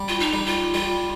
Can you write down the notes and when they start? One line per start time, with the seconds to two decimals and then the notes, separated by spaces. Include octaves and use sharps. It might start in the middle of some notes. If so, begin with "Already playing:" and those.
Already playing: G3
0.08 F4
0.20 D#4
0.33 G3
0.46 F4
0.74 G3 F4